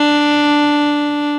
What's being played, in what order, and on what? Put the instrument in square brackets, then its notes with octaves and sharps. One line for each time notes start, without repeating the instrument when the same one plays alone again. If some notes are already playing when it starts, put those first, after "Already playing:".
Already playing: [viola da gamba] D4